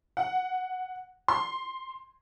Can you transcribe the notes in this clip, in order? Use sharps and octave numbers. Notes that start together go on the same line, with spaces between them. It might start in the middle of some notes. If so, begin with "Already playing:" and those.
F#5
C6